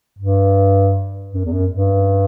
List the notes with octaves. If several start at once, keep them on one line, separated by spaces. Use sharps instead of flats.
G2
F#2
E2
F#2
G2